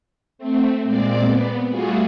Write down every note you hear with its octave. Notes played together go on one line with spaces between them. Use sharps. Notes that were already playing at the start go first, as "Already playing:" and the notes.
A3 C4
A#2 G#3 C4 D5
B3
G3 A3 F4 F#4 G#4